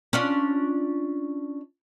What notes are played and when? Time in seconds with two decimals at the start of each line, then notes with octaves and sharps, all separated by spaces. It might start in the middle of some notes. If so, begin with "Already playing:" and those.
0.13 C#4 D4 F4